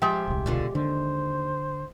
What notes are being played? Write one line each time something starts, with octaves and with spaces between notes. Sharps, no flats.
F3 G#3 G4 E5 G5
D#1 C2 G4
B2 D3 F4
D#2 D3 C5